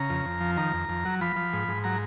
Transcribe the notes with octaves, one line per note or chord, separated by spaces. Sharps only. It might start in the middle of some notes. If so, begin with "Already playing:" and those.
Already playing: C#3 A#5
F2
F2
F3
D#3 A#5
F2
F2
F#3
F3 B5
F3
G#2
G#2
F#3 A#5